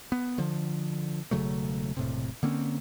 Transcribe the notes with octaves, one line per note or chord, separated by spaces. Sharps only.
B3
D3 F3
E1 C#3 F#3 A3
E1 A2 C3
D3 A#3 C4 C#4